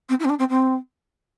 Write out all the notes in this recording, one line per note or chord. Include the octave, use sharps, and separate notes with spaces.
C4
E4
C4
D4
C4
C4